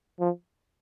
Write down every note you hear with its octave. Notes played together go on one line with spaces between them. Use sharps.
F3